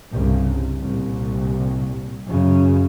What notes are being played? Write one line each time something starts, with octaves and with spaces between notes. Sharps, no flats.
C2 G2 C#3
C2 A#2
F#2 C#3